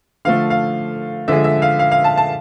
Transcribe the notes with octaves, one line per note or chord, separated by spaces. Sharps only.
D3 F3 A3 F5
F5
D3 F3 G#3 E5
E5
F5
F5
F5
A5
A5